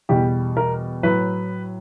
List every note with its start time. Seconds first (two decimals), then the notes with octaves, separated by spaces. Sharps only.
0.09 E2 B2 G3 G4
0.57 A#4
1.03 A2 F#3 B4